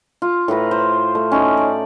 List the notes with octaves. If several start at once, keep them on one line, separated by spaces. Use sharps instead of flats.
F4
A2 F4 B4 A#5
C5
A3
C#4 D#4 F#4
D5